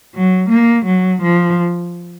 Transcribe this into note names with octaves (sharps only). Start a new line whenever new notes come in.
F#3
A#3
F#3
F3